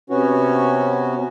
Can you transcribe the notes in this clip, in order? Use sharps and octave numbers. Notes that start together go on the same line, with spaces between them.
C3 B3 C#4 F#4